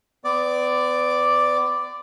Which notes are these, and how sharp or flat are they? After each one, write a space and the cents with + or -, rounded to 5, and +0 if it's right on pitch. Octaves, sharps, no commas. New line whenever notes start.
B3 +40 D5 +0 D6 +0